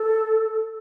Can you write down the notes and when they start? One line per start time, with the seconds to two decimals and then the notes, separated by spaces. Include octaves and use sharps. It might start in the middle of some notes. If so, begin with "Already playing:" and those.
Already playing: A4